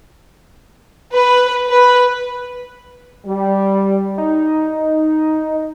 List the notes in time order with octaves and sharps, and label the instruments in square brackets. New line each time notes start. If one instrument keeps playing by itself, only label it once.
[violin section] B4
B4
[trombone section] G3
[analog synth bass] D#4